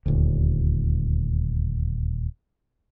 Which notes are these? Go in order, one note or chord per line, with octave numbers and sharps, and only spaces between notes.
D#1 D2